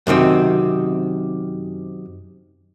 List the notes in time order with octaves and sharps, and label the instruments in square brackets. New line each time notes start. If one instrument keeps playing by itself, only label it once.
[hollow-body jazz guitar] F#2 C3 D#3 C4